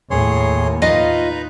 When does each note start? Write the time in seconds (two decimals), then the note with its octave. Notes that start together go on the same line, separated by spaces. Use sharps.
0.11 D#2 A2 G#4 C#5 C6
0.82 D#4 F4 B4 D#5 F5 A#5